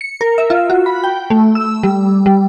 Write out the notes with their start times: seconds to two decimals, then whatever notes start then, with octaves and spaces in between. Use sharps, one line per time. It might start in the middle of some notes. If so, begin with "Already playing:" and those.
0.01 C#7
0.21 A#4
0.38 E5
0.50 F4
0.70 F#4
0.86 B5
1.04 G5
1.30 A3
1.55 E6
1.83 G3
2.26 G3